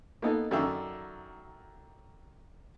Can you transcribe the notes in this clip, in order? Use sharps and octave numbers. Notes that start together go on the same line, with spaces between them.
A#3 B3 D#4 A4
F#2 D3 D#3 E5